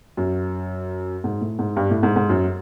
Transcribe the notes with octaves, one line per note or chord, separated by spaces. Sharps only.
F#2
G#2
A2
G#2
G2
A2
G#2
G#2
F#2